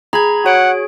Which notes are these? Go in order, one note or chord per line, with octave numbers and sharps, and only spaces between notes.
G#4 A#5 B5 G#6
F#4 C#5 F#5 D7